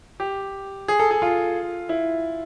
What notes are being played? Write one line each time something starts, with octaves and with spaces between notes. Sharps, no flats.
G4
G#4
A4
G#4
F4
E4